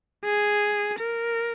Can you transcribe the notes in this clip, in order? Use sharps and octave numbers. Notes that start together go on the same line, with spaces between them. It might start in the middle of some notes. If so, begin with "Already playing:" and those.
G#4
A#4